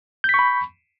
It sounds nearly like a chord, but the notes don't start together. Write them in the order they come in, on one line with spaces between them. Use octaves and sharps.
G6 B6 C#6 B5